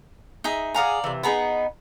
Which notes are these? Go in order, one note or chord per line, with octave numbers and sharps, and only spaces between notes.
D#4 G#4 E5
G#4 D5 F5 F#5 G#5 A#5
C3 E3
B3 D#4 G#4 A#5 B5